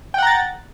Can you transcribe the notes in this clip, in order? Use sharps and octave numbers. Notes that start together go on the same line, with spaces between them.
F#5 G5 A#5 A6